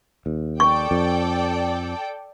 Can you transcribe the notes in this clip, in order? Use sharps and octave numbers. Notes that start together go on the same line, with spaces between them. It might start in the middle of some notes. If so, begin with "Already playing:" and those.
D#2
A4 D5 G5 C#6
F2